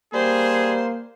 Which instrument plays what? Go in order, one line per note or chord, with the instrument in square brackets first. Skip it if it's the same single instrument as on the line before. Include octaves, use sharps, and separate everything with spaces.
[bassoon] G3 [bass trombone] A#3 [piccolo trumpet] G#4 [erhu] C5